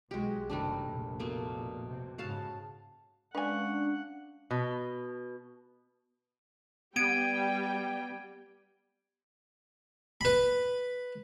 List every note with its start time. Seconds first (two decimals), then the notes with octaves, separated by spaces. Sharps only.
0.11 B1 G#3 F#4 G4
0.50 F#1 C3 D#3 G3 A3 D4
0.89 F1 A#1 A#2
1.20 B2 A3 A#3
1.87 C3
2.18 G#2 C#3 F#4 F5 A5
3.35 G#3 C#4 D4 B4 F5 F#5 G#5
4.51 B2
6.96 G3 B3 G5 G#6 D7 D#7
10.21 B4 B5